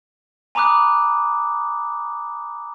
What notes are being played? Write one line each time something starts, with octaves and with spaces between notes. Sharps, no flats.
G#5 A#5 B5 D6 D#6 F#6